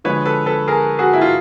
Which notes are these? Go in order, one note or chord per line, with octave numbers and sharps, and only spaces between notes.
D3 F3 G#3 B4 C#5
A4 B4
A4 B4
G#4 A#4
F#4 G#4
E4
F4